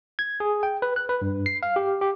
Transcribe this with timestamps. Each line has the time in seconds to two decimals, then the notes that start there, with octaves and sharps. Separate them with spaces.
0.19 G#6
0.40 G#4
0.63 G5
0.82 B4
0.96 F#6
1.09 B4
1.22 G2
1.46 C7
1.63 F5
1.76 G4
2.01 G4